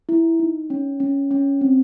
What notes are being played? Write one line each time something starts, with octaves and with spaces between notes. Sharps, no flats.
E4
D#4
C#4
C#4
C#4
C4